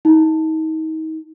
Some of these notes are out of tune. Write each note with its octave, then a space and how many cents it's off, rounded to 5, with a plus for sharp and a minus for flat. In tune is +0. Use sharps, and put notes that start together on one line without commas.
D#4 +35